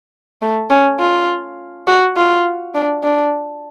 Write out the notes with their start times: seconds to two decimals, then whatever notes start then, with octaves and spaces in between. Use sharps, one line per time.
0.42 A3
0.70 C#4
0.99 F4
1.87 F#4
2.16 F4
2.74 D4
3.03 D4